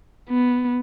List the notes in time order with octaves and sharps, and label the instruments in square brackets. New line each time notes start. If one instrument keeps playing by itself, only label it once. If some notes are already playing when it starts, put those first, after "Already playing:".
[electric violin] B3